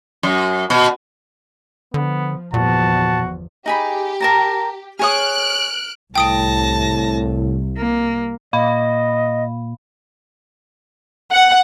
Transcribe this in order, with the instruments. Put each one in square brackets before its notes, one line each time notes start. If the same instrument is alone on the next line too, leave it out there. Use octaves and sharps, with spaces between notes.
[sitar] F#2
B2
[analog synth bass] D3 [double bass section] F3 [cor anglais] B3
[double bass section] G1 E2 F3 [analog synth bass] A#2 [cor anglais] F#4 [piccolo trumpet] A5
[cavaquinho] D#4 G#4 B5 [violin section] G4
[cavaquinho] A#4 A5 A#5
[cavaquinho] G#4 C#5 D#6 [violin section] F6 F#6 D7
[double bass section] C2 [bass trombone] A2 [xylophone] G5 D#6 D7 [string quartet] A5 A#6
[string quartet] A#3
[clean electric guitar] A#2 [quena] D#5 [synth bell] F5 B5
[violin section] F#5